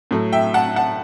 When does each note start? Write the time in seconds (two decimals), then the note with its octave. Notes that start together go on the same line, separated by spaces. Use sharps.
0.11 A2 F#3 A3
0.32 E5 G5
0.54 F#5 A5
0.76 F#5 A5